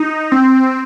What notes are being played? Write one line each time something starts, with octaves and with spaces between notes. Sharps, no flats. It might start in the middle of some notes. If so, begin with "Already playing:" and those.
Already playing: D#4
C4